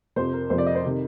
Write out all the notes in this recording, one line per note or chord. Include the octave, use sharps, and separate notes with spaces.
F2 C3 F3 C5
A#4
F2 C3 F3 C5
D5
D#5
C5
C3 D#3